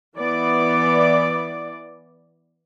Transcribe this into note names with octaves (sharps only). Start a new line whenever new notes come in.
E3 B3 D5